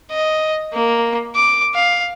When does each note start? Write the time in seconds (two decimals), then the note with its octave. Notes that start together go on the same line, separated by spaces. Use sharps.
0.11 D#5
0.73 A#3
1.35 D6
1.75 F5